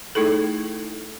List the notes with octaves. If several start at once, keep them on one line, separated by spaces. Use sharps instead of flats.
A3 D#4 E4 G#4 A4